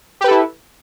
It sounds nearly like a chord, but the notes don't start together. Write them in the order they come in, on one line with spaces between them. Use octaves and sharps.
G4 B4 A4 E4